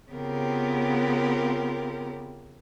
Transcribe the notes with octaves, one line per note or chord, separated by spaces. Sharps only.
C#3 B3 C4 F4 G4 A#4